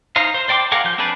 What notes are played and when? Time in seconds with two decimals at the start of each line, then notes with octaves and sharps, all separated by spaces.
0.16 D#4 C5 F5
0.34 C5
0.48 C5 D5 G5 C6 D6
0.72 G#4 A#4 F5 F#5 D6
0.84 F3 G6
0.98 C4 D4 G#4 B4 D5